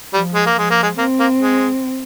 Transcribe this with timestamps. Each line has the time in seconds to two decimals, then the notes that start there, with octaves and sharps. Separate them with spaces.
0.13 F3 G3
0.34 G#3
0.46 A#3
0.56 F3 G#3
0.70 A#3
0.83 G#3
0.98 A#3 C4
1.19 A#3
1.41 G#3